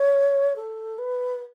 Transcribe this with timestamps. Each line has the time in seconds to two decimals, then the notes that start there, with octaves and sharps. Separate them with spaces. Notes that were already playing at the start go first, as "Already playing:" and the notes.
Already playing: C#5
0.55 A4
0.98 B4